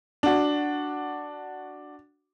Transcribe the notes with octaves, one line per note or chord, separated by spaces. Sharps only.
D4 F#4